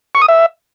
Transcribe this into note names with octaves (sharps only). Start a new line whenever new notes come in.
C#6
D#6
E5